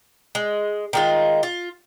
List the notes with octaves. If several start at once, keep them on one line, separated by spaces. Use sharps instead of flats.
G#3
D#3 G#3 F4
F4